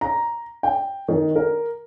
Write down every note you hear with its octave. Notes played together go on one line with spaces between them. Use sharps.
A#5
G5
D#3
A#4